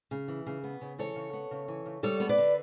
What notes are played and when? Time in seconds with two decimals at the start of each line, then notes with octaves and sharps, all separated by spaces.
0.11 C#3
0.28 E3
0.46 C#3
0.64 B3
0.81 C#3
0.98 E3 A4 C#5
1.16 C#3
1.33 B3
1.51 C#3
1.68 E3
1.86 C#3
2.03 G3 A4 C#5
2.20 B3 C#5
2.29 B4 D5
2.38 D3